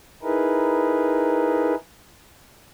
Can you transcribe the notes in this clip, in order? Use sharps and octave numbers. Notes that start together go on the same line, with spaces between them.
D#4 E4 G#4 A#4 B4